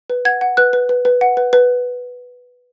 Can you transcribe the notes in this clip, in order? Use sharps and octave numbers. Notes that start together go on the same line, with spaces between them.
B4
F#5 G#6
F#5
B4 F#6
B4
B4
B4
F#5
B4
B4